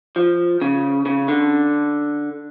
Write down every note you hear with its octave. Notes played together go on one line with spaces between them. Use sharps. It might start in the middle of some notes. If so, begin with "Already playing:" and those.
F3
C#3
C#3
D3